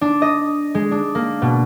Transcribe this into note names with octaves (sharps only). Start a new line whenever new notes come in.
D4
D#5
G#3
D4
A#3
B2